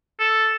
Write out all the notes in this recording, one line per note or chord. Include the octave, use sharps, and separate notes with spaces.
A4